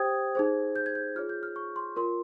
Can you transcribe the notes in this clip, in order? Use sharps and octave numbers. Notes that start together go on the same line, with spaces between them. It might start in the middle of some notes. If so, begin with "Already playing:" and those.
Already playing: G4 C5 G5 D#6 G#6
D#4 G#4 C5
G6
G#6
G6
F4 G#4 C#5 F6
G6
F6
C#6
C6
F4 A#4 C#5 C6